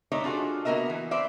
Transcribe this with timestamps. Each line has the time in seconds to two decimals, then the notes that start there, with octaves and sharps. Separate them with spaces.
0.12 A3 D#4 B4 C#5 D5 E5
0.24 D4 F4 F#4 G#4 A4
0.65 A#3 B3 F#4 A#4 D#5 E5
0.90 E3
1.11 B4 C5 D5 E5